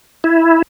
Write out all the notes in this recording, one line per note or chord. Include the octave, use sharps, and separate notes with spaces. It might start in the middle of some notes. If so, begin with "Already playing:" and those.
E4